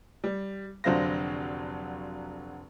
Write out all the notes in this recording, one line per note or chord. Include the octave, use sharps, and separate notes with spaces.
G3
F1 D3 F#3 C5 F5 A#6